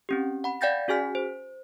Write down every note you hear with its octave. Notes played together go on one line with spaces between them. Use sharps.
C4 C#4 G4
F#5 B5
D5 F5 G5 G6 A6 A#6
C#4 F#4 G#4 G#5 F6 B6
C5